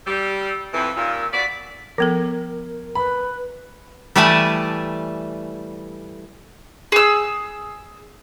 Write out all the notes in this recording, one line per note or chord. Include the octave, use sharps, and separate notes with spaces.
G3 E6
F2 E3 E6
D#2 A#2
B3 F#4 D5 B6
F3 B3 A4 A#4
B4 B5
E3 G3 A3 D5 G#5 A5
G#4 E6